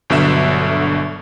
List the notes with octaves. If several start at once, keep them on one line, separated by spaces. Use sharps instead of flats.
G1 B2 D3 F#3 E5 E7